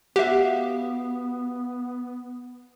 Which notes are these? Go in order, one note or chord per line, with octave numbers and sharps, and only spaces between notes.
B3 F#4 G4 E5 F5